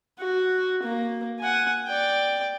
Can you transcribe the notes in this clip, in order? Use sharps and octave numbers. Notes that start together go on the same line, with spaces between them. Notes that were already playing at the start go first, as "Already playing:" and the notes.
F#4
A#3
F#5 G#5
D5 G5